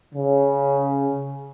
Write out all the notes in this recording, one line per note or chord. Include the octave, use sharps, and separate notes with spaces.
C#3